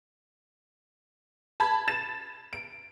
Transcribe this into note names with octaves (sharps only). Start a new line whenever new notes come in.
A5 B5 G#6
A6 E7
D7